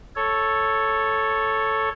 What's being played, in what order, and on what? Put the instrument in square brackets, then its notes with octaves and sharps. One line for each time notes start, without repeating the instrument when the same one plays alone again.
[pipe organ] A4 C#5